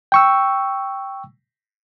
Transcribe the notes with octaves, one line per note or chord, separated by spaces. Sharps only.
G5 C#6 E6